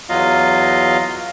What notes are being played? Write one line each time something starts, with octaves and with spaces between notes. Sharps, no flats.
E2 F#3 F4 D#5 F5